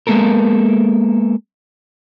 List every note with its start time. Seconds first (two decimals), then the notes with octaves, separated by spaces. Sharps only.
0.07 G#3 A#3 B3 A4 A#4